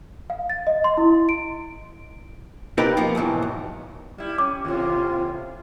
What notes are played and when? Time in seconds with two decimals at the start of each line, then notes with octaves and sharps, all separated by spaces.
0.30 F5
0.50 A6
0.67 D#5
0.84 C6
0.97 E4
1.29 D7
2.78 C4 D#4 F4 G4 A#4 B4
2.97 F3 A#3 B3
3.15 B1 G#2 D#3 E3
3.42 B1
4.18 G3 E4
4.38 C#4 D6
4.65 D#2 A2 C3 F4